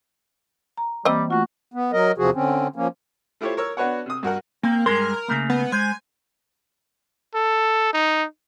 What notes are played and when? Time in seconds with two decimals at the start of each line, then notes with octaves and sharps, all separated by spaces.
0.77 A#5
1.05 E3 G3 A#3 C4 D#5
1.30 A3 F4 F#4
1.74 B3
1.93 F#3 A#4 D#5
2.18 E2 C3 F3 F#4 G#4
2.34 D3 C4 C#4
2.76 F3 A#3 C#4
3.41 A3 E4 F4 G4 C5 C#5
3.57 A#4 C#5 E6
3.77 B3 D4 F#4 B4 C#5 F#5
4.06 C3 D#6
4.23 G2 F#4 A#4 F#5
4.63 A#3 C4
4.86 G2 G#3 A#4 C6
5.28 C#3 A3 A#3
5.50 B3
5.72 G#3 C5 G#5
7.35 A4
7.93 D#4